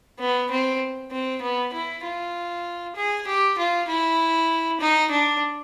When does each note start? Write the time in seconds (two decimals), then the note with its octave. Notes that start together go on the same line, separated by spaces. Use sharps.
0.19 B3
0.51 C4
1.11 C4
1.42 B3
1.73 E4
2.03 F4
2.96 G#4
3.27 G4
3.58 F4
3.88 E4
4.80 D#4
5.11 D4